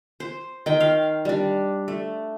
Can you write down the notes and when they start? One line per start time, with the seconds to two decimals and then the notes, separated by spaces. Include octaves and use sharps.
0.20 C5
0.66 D#3 G5
0.80 F5
1.25 G3 D4
1.88 A3